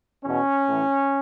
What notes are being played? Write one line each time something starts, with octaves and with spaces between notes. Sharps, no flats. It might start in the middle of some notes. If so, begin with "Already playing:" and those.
E2 B2 C#4
A2 E3